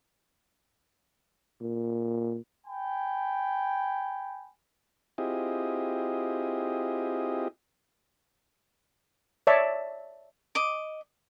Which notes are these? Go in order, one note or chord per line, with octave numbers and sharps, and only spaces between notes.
A#2
G5 G#5 B5
C4 E4 F4 G4 G#4 D#5
C#5 D5 E5 A5
D#5 D6